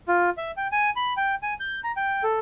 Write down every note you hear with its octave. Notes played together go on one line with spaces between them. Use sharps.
F4
E5
G5
G#5
B5
G5
G#5
G6
A#5
G5
A4